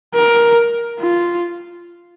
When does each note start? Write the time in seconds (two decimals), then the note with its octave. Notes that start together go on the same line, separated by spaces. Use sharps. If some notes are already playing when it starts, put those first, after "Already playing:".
0.15 A#4
0.99 F4